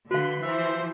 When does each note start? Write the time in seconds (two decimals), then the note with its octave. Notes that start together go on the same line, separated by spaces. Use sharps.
0.11 D3 F#4 B4 F5 C6
0.43 E3 F3 C5 E5